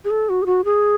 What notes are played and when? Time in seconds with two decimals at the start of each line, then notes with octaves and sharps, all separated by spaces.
0.04 G#4
0.10 A4
0.29 F#4
0.42 G#4
0.46 F#4
0.65 G#4